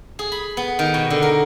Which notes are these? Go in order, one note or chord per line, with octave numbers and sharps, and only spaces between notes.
G#4
B5
B3
D#3
B2
D3
A#4